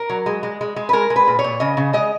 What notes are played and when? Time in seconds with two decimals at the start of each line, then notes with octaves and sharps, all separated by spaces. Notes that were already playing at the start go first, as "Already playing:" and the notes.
Already playing: A#4
0.10 F#3
0.26 G#3
0.43 G#3
0.61 G#3
0.76 G#3
0.89 B4
0.93 G#3 A#4
1.10 G#3
1.16 B4
1.28 A#2
1.39 C#5
1.44 A#2
1.60 C#3 D#5
1.77 C#3
1.93 G#3 D#5